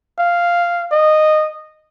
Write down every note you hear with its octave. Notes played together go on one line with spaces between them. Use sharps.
F5
D#5